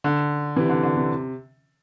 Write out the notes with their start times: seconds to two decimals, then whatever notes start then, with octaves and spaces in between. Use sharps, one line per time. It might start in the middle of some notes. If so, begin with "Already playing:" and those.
0.04 D3
0.56 C3 E3
0.69 D3
0.83 D3
0.96 C3